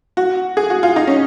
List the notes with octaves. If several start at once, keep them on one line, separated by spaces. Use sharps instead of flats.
F#4
G#4
F#4
F4
D#4
C#4